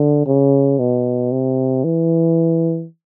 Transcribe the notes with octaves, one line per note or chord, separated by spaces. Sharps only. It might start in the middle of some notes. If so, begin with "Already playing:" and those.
Already playing: D3
C#3
B2
C3
E3